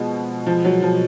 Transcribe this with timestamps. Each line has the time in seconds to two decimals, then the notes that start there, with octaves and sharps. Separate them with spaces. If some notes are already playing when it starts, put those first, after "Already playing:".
Already playing: B2 F3 G#3
0.46 F3
0.65 F#3
0.82 F3